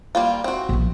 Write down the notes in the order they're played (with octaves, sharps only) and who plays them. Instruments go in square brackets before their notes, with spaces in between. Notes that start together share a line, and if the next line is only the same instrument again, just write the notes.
[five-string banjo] G3 A#3 F4
C4 F#4
[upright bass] A#1 F3